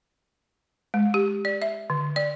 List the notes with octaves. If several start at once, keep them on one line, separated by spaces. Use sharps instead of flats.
G#3
G4
D5
E5
D3
D5